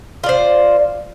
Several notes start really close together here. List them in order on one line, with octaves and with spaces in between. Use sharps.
F4 D5 C5